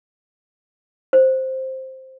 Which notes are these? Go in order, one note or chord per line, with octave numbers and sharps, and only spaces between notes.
C5